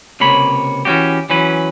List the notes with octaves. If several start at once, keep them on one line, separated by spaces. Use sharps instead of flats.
C#2 C3 A#3 C#5 B5
E3 C#4 D4 F#4 G4
E3 F#3 C#4 B4